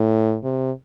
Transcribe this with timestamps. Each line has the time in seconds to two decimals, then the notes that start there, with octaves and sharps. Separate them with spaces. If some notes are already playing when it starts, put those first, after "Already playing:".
Already playing: A2
0.44 C3